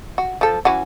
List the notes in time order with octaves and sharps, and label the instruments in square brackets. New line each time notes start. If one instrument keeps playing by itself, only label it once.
[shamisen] F#4
F3 A4
E3 C#4 F#4